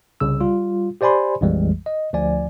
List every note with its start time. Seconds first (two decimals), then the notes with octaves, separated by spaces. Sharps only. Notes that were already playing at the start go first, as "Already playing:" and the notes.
0.20 C2 C#3 E6
0.41 G3 F4
1.01 G4 C5 D5 G#5 B5 C6
1.41 A#1 F2 E3 G3 G#3
1.86 D#5
2.13 D2 F3 D5 G#5